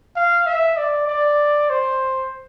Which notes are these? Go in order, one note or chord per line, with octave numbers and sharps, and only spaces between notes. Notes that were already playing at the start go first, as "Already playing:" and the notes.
F5
E5
D5
D5
C5